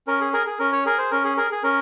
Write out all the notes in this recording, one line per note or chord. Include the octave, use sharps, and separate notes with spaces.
C#4 A#4
G#4
G#4 A#4
G#4
C#4 A#4
C#5
G#4 A#4
C5
C#4 A#4
G#4
G#4 A#4
G#4
C#4 A#4